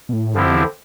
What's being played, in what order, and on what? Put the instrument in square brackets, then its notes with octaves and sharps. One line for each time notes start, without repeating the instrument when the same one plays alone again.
[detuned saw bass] B2
A2
[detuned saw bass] G2 [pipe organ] D3 F3 C4 E4 G4
[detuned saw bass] F2
E2